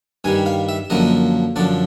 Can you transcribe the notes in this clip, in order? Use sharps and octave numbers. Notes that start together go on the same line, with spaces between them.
G2 D#3 G3 G#5
F5
E5
F#2 D3 F3 A#3 D#5
F#2 D3 F3 D5